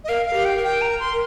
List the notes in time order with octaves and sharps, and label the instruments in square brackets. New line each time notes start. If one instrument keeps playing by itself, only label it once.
[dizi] D#5
[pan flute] A#4 [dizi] F5
[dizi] F5
[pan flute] G4
[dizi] G5
[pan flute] A#4
[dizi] G5
A#5
C6